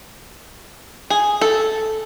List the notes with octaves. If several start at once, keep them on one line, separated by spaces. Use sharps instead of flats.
G#4
A4